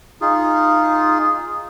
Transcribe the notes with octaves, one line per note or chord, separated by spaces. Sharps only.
D#4 F4 G#4